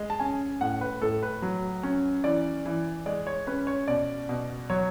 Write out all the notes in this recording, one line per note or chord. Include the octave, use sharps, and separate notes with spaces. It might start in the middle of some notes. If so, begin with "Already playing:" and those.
Already playing: G#3
A5
C#4 G#5
A2 F#5
B4
A2 A4
B4
F#3
C#4
E3 D5
E3
G#3 D5
C#5
C#4 B4
C#5
B2 D5
B2
F#3 C#5